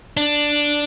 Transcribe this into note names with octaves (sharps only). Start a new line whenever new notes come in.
D4